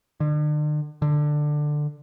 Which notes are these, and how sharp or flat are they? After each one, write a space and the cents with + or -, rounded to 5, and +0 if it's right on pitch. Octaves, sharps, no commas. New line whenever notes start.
D3 +40
D3 +15